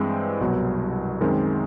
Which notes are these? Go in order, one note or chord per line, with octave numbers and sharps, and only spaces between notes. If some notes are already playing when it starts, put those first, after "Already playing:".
Already playing: G2 E3 G#3 C4
C2 B2 F#3
F#2 D#3 G#3 C4